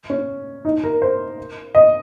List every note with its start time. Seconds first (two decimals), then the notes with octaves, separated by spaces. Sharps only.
0.10 C#4
0.65 D#4
0.84 A#4
1.02 C5
1.75 D#5